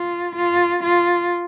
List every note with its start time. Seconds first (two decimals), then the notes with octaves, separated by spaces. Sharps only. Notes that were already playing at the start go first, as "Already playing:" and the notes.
Already playing: F4
0.36 F4
0.83 F4